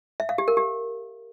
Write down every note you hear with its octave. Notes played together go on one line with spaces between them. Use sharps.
E5
F5
G4
A#4
G4